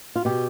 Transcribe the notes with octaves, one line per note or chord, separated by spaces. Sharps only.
F4
B2 G4